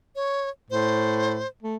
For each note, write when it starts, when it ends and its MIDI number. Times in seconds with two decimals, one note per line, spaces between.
0.16 0.49 73
0.70 1.42 45
0.70 1.47 72
1.63 1.75 57